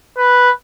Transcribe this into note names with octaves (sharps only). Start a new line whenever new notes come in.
B4